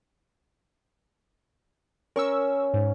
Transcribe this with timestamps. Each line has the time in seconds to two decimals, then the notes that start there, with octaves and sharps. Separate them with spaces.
2.16 C#4 A#4 C#6 E6
2.74 G#2